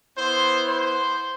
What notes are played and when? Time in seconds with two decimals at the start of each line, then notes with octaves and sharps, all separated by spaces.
0.18 B3 E4 C5
0.66 C5